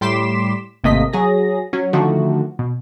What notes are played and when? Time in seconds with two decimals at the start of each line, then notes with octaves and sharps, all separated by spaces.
0.01 A2 G3 C6 D6 B6 E7
0.84 G#1 C3 A3 A#3 D#5 B6
1.13 F#3 G#4 A#6
1.73 F#3 C#4
1.93 D3 D#3 F3 A3 F#4
2.59 B2